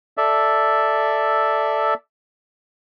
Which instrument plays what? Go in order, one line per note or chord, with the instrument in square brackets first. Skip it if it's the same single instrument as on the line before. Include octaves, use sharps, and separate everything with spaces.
[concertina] A4 D5 E5